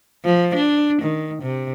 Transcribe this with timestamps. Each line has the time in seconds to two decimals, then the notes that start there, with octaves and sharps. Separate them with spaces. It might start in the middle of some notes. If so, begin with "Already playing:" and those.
0.25 F3
0.55 D4
1.02 D#3
1.42 C3